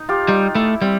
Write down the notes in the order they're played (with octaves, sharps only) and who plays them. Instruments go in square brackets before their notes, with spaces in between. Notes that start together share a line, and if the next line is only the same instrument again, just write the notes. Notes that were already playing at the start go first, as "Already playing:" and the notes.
Already playing: [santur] D#4
F4 G4
[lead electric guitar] G3 [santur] D#4 F4
[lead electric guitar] A3 [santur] E4
[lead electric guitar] G3 [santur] C4